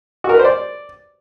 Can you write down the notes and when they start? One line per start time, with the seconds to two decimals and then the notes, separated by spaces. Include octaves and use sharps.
0.24 F#4
0.29 A#4
0.34 B4
0.39 C5
0.45 D5